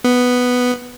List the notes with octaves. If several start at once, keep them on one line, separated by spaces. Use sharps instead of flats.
B3